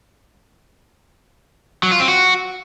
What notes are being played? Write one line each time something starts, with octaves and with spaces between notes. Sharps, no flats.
F#3
F4
C4
F#4